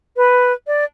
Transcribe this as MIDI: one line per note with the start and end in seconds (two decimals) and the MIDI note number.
0.17 0.53 71
0.67 0.84 74